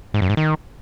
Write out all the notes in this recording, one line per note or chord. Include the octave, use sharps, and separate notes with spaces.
G#2
F#2
G#2
D#3